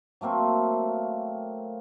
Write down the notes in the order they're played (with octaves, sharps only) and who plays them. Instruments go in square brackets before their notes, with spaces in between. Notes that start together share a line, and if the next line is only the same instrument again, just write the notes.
[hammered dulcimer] F#3 A3 A#3 C4